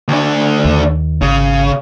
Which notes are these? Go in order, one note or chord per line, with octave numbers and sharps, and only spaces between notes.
D2 D4
D#2
G#1 C#3